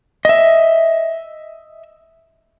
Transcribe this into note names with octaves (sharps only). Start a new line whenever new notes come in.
D#5 E5